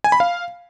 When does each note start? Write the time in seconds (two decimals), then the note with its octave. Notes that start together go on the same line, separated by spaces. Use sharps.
0.04 G#5
0.12 B5
0.20 F5